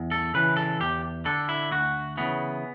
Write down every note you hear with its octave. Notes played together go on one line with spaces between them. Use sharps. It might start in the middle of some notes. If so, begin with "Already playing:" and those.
Already playing: E2
A4
C#3 E3 B4
A4
E2 G4
D3 A4
E4
D2 F#4
C#3 E3 B3